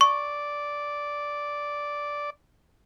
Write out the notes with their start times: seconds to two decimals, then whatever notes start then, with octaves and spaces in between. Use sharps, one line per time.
0.01 D5 C#6